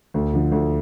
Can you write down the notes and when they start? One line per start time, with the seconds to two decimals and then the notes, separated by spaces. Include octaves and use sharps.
0.14 D2
0.33 D3 F3
0.52 D2